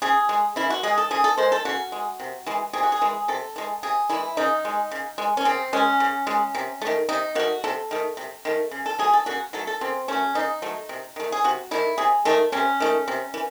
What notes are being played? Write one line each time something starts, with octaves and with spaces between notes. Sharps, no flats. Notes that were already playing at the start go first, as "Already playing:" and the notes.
C#3 G#4
G#3
C#3 E4
F#4
G#3 G#4
A4
C#3 G#4
A4
G#3 C5
A4
C#3 F#4
G#3
C3
E3 G#3
C3 G#4
F#4
G#4
E3 G#3
C3 A4
E3 G#3
C3 G#4
E3 G#3 E4
C#3 D#4
G#3
C#3
G#3
C#4
C#3 C4
G#3 C#4
C#3
G#3
C3
A3
D#3
C3 D#4
D#3 A3 F#4
C3 A4
D#3 A3
C3
D#3 A3
C#3
A4
F#3 A3 G#4
A4
C#3 F#4
F#3 A3 A4
A4
C#3 C4
F#3 A3 C#4
C#3 D#4
F#3 A3
C3
D#3 A3
G#4
C3 F#4
D#3 A3 E4
C3 G#4
D#3 A3 A4
C3 C#4
D#3 A3
C3
E3